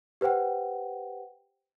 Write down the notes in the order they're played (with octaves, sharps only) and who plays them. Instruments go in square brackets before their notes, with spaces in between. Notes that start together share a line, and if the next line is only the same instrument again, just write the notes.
[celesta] G4 B4 C5 F#5 G5